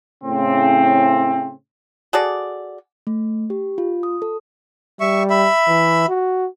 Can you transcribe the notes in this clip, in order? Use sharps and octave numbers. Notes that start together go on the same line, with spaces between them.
A2 C#3 C4
F#4 G#4 A4 D5
A3
G4
F4
D#6
A4
G3 E5 C#6
E5 B5
E3
F#4